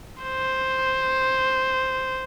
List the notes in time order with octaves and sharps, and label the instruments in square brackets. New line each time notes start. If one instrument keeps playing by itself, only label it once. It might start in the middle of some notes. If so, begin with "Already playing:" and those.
[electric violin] C5